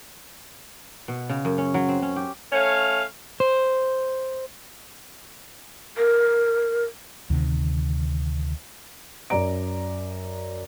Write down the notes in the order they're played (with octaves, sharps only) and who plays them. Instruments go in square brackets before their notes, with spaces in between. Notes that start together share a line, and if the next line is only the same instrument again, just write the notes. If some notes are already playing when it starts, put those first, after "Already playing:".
[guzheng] B2
C#3
F#2
C#4
F#3
C4
C#4
G4
[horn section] A3 C#4 C#5 F5
[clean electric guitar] C5
[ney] A#4
[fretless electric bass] D2 C3 D#3
[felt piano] F#2 D5 A#5 D7